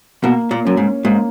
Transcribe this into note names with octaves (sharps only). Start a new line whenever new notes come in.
B2 A#3
A#2
F#2 C#4
G#2
G#2 A#3